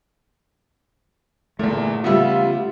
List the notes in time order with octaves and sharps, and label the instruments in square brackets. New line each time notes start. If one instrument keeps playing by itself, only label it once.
[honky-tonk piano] G1 A#2 [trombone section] E2 [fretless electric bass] A3
[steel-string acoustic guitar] E2 C#3 G3 [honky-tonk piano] B3 E5 E6 [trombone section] F4